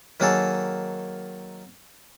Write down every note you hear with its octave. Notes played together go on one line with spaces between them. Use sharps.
D#3 F#3 A#3 G#4 A4